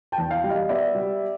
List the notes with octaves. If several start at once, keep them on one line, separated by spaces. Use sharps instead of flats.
G5 A5
E2
F5 G5
G3
D#5 F5
B3 D5 E5
G3